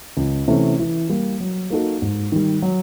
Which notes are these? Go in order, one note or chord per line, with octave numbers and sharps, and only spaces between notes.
C#2
C3 E3 A3 C#4
E3
G3 A#3
F#3
A#3 D#4 F#4 A4
G#2
D#3 G3
F#3